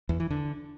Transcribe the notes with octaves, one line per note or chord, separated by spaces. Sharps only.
E2
E3
D3